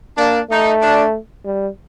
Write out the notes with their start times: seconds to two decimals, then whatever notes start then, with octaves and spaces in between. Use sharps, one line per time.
0.18 A#3 D4
0.50 A3 D#4
0.82 D4
1.45 G3